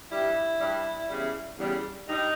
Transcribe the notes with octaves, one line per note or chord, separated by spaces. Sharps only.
G2 G3 E4
G2 G3
E2 C#3 G3
E2 C#3 G3
G2 G3 D#4